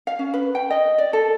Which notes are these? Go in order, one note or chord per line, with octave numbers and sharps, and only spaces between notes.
F5
C#4
B4
G5
D#5
D5
A4